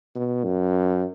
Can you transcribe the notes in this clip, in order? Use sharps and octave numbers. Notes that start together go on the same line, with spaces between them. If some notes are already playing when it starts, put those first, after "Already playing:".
B2
F#2